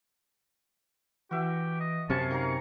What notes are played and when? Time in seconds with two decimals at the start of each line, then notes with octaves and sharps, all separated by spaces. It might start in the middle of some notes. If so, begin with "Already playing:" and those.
1.31 E3 F#4 G4 E5
1.80 D#5
2.10 F#2 C3 C#5 F5 G#5 A5 C#7
2.31 D#3 C#5 F5 A#5